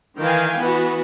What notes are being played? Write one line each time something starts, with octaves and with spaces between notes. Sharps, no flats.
D#3 E3 F5 G5 G#5
E3 B3 F#4